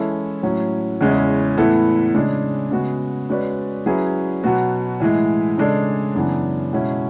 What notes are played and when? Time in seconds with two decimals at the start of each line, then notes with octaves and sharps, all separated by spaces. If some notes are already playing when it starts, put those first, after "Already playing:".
Already playing: E3 G#3 C#4 E4 A4
0.43 A2 F#3 C#4
1.01 E2 C#3 G#3 C#4 E4
1.57 A2 E3 B3 E4 A4
2.15 C#3 G#3 D4
2.71 C#3 G#3 B3 F#4
3.29 G#3 C#4 F#4 B4 D5
3.86 F#3 C#4 E4 G#4 B4
4.43 B2 F#3 B3 F#4
5.00 A2 E3 G#3
5.58 C#3 G#3 D4 A4 D5
6.15 F#2 C#3 E3 B3 D4
6.73 B2 G#3 C#4 E4